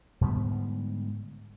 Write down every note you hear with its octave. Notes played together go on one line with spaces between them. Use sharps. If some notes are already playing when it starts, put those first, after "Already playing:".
G#2 D3 G3 B3